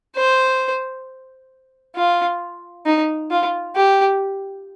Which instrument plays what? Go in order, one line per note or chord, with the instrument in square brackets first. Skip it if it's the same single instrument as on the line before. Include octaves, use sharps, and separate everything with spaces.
[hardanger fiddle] C5
F4
D#4
F4
G4